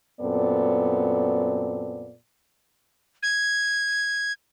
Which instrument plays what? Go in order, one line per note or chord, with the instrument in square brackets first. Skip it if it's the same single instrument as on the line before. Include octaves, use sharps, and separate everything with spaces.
[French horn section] F#2 A#2 B3 C4 A4 D5
[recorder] G#6